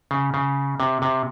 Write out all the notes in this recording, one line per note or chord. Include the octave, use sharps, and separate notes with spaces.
C#3
C#3
C3
C3